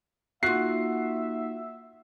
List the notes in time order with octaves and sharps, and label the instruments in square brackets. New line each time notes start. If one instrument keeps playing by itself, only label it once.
[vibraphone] A#3 D#4 F#5 [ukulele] F4 F#4 [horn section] E5 [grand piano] C7